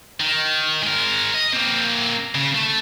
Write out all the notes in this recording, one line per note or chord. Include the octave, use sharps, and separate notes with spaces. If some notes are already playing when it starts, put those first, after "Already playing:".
D#3
G#3 A#4
D#5
A#3 C4
C#3
A3